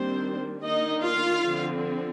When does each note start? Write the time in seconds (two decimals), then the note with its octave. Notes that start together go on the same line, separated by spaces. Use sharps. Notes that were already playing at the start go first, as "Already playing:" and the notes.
Already playing: D#3 G3 A#3 C4 D4 C5
0.63 D#3 A#3 D4 D#4 D#5
1.03 F4 F5
1.45 D3 F3 C4